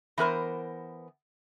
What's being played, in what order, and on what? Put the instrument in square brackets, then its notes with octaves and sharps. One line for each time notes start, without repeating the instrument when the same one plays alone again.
[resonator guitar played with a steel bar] E3 B3 A#4 C5